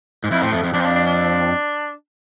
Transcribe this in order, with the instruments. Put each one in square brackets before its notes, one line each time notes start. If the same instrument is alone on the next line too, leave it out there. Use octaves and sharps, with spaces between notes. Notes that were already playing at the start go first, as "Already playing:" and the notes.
[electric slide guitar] G#2
[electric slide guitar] F2 [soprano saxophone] E4
[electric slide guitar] A2 [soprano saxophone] C4
[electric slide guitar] F2 [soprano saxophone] A3
[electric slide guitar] F2
[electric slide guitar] F2 [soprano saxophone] D4
[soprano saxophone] C4
D4
D4
D4